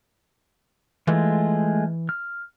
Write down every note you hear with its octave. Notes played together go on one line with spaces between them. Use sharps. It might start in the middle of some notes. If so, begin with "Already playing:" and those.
E3 G#3 A3 F4
F6